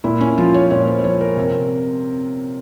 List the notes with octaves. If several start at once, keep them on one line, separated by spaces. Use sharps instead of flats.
A#2 E4
C#4
F3 F4
C#5
A#2 C#5
C5
C5
F3 C#5
A#4
C3